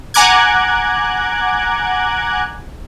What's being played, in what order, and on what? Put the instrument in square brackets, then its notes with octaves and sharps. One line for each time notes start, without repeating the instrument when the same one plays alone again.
[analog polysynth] F#5 G#5 A#5 D6 F#6 G#6